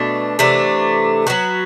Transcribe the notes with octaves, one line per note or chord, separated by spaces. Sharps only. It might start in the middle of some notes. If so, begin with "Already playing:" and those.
Already playing: B2 A3 D4
C3 E3 A3 D4
F#3 B3 F#4